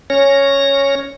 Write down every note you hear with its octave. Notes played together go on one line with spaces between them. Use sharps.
C#4 C#5 A#6